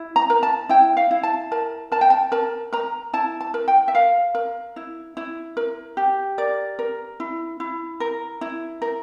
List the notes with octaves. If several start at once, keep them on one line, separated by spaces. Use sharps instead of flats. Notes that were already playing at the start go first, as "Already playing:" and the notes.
Already playing: E4
A#5
A#4
A5
E4 G5
F5
E4
A5
A#4 A5
A#4 A5
G5
A5
A#4 A5
A#4 A#5
E4 A5
A5
A#4
G5
E5
A#4 F5
A#4
E4
E4
A#4
G4
A#4 D5
A#4
E4
E4
A#4
E4
A#4